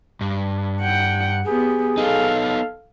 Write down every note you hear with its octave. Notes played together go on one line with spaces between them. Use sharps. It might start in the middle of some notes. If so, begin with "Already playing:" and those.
G2
F#5 G5
B3 G4 G#4
B3 D#4 A4 F5